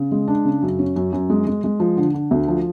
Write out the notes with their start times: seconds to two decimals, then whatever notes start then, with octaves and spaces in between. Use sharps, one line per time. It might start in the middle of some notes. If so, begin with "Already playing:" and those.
Already playing: C#3
0.12 G#3
0.28 D4
0.45 C#3
0.62 F#2
0.79 C#4
0.96 F#2
1.13 F#2
1.30 G#3
1.47 G#3
1.64 G#3
1.80 F3
1.97 D3
2.14 D3
2.31 D2
2.48 F3